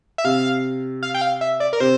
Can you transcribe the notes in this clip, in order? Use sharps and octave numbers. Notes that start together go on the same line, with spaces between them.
E5
C3 F5
F5
G5
F5
E5
D5
A#4
C3 C5